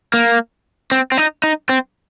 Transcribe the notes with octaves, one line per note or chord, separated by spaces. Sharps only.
A#3
C4
C4
D#4
D#4
C4